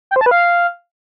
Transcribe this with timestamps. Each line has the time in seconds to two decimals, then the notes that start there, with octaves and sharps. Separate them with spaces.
0.11 G5
0.16 C5
0.21 A5
0.26 B4
0.31 F5